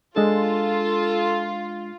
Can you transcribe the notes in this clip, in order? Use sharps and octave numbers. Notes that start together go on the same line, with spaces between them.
G#3 D4 F4 A4